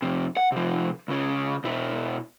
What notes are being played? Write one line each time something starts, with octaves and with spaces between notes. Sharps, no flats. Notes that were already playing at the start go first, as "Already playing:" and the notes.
F2 C3
F#5
C3 F3
C#2 C#3
B2 E4